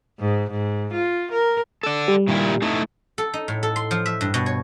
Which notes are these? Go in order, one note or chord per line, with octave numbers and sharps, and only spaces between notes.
G#2
G#2
F4
A#4
A4 D5
G3
A#2 D#3 E4
A3 D#4 E4
A4
D#4
A2
A4
C6
F3
E5
G2
B2
C#5